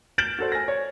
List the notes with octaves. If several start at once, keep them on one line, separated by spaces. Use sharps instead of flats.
F6 G6 A6 D7 E7 F#7
F#4 A4 C5
G#5 A#6
C#5